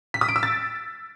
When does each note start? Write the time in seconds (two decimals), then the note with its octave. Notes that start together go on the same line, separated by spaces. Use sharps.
0.14 B6
0.21 D#6
0.29 D7
0.36 E6
0.43 A6